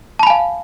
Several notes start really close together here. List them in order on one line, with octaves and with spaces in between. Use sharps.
A5 B5 G#5 F5